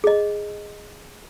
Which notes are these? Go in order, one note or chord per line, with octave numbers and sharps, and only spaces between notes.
G#4 D#5